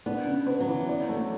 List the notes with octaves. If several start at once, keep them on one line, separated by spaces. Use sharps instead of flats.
B3 D4
C#3
B3
F#3
E3
D5
A3